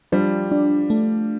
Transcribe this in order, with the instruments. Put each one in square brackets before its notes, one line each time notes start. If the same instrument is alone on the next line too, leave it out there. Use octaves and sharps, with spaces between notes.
[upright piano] F3 G3 [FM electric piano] D4
[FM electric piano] D4
A3